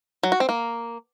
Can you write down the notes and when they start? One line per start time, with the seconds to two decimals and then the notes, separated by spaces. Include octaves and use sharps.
0.23 F#3
0.32 F#4
0.40 C4
0.49 A#3